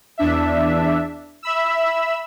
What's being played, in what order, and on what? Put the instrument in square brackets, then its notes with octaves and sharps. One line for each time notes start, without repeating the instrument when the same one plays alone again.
[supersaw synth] E2 D4 E5
E5 B5 E6